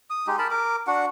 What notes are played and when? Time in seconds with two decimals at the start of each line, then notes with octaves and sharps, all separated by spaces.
0.10 D#6
0.27 G#3 D#4 G4
0.39 A#4 A5 B5
0.51 A#4 D6
0.87 D4 F#4 F#5